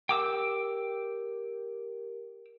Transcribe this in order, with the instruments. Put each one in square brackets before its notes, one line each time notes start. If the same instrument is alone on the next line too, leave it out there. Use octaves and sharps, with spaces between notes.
[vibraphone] G4 A#4 [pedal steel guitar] G5 D6 E6